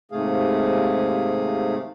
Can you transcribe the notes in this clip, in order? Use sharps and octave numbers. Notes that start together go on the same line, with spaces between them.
D#2 G#2 C3 A3 G#4 F5